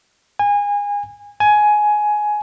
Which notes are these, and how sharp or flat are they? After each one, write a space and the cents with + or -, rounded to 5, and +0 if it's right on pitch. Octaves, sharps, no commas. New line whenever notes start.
G#5 -25
G#5 +15